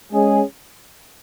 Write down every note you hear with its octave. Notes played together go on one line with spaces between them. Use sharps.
G#3 C#4 G#4